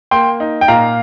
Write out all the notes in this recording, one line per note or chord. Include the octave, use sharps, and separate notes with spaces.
A#3 G5 C6
D#4
G5
A#2 F5 A#5